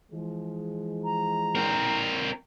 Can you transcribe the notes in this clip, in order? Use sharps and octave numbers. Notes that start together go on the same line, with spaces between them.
E3 F3 G#3
A#5
C4 A#4